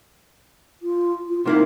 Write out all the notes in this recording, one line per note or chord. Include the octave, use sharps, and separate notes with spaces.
F4
F4
C3 A#3 D#4 E4